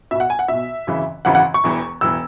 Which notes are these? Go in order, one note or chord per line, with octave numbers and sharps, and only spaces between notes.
B1 B2 E5
F#5
G#5
F#5
B1 B2 E5
G#1 F#2 C#3 E3
G#1 F#2 C#3 E3 F#5
F#5
C#6
E1 E2 E3
E1 E3 E6